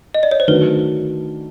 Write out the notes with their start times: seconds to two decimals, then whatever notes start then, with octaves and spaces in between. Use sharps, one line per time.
0.15 D#5
0.23 D5
0.31 C#5
0.40 C5
0.48 D#3 F#3 A3 D4 B4